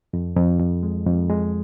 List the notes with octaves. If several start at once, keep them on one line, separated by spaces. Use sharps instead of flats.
F2
F2
F2
G#3
F2
G#3